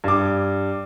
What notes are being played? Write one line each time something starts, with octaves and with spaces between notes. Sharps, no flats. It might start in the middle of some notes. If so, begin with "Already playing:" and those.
G2 D6